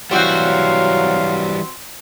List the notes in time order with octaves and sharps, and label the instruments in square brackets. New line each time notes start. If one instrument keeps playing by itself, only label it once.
[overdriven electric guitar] E3 G3 [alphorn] F#3 [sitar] C4 F#4 [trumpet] F5